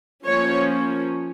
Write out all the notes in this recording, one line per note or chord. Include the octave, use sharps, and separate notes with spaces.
F3 A#3 C#4 C#5